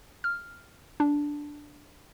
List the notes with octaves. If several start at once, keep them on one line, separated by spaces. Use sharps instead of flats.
F6
D4